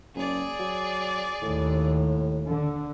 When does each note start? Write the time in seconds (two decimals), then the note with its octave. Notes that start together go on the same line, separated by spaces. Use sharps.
0.15 F#1 G#4 D5
0.59 F#3
1.42 D#2 A2
2.47 D3